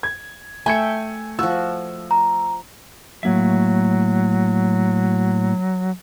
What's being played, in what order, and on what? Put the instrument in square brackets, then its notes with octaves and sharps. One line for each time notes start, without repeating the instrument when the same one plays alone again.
[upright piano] G#6
[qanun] A3 E5 G5 [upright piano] G#5 G#6 C#7
[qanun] F3 F#4 [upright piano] E6
[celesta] A#5
[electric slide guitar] A2 A#3 E5 [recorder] F#3